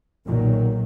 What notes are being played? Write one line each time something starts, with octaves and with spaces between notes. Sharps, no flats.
B1 A#2 D#3 F#3